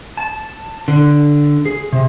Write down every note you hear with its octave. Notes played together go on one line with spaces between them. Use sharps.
A5
D3
G#4
C3